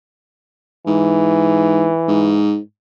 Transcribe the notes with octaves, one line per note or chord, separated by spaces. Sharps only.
G#2 E3
G#2